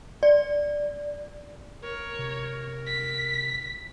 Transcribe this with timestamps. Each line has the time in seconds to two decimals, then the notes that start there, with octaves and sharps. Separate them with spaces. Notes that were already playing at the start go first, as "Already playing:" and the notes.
0.23 D5
1.83 A#4 C#5
2.19 C3
2.87 B6